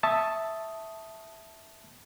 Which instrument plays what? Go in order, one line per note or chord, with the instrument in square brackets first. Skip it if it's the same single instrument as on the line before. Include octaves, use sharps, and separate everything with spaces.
[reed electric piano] E5 A5 C#6 D#6